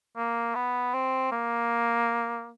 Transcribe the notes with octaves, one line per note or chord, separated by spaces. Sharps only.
A#3
B3
C4
A#3